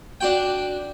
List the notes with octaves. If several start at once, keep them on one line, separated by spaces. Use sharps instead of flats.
D4 F#4 G5